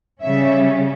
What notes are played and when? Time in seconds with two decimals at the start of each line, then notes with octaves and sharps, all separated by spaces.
0.23 C#3 G3 C#4 E5